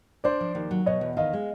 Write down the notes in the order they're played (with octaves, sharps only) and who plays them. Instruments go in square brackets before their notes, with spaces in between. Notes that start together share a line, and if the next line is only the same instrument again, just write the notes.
[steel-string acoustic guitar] D4 [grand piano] C5 D5
[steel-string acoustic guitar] F3
D#2
F#3
[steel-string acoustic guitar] B2 [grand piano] C#5 D#5
[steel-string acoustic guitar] E2
[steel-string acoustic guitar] D#3 [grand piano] D#5 F5
[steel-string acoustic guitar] G#3